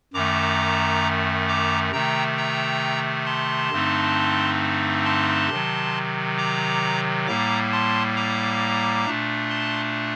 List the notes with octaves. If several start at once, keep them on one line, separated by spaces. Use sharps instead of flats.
F#2 D#3 A3 A#5 D6
A#5 D6
C3 D#3 A3 G5 A#5
G5 A#5
A5 C6
G2 D3 A3 C4 D#4
A5 C6
C3 D#3 F#3
A#5 D6
A2 G3 A#3 A#5 D6
A5 C6
A#5 D6
A#2 A3 D4
A5 C6